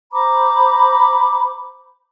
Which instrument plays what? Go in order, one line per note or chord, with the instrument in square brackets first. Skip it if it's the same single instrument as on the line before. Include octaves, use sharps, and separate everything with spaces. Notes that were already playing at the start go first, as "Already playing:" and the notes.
[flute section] C5 A#5 B5 D6